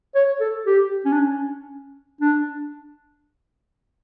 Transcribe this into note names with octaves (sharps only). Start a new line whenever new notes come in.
C#5
A4
G4
C#4
D4
C#4
D4